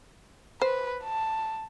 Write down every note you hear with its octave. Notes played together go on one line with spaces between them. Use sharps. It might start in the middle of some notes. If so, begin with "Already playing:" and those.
B4 C5
A5